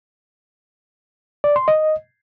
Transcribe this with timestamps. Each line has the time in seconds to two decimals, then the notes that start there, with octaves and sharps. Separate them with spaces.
1.44 D5
1.56 C6
1.68 D#5